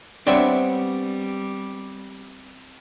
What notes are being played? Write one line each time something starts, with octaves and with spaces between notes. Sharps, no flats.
G3 B3 C4 D4 C#5 D5 E5